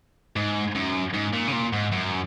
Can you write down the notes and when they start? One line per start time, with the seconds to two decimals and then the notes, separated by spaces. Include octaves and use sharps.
0.36 G#2
0.75 F#2
1.14 G#2
1.33 A#2
1.48 C#3
1.53 A#2
1.73 G#2
1.92 F#2